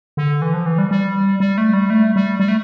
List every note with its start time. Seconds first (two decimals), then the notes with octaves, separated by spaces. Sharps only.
0.17 D3
0.42 E3
0.54 F3
0.66 E3
0.78 G3
0.91 G3
1.40 G3
1.58 A3
1.73 G3
1.90 A3
2.16 G3
2.40 G3
2.48 A3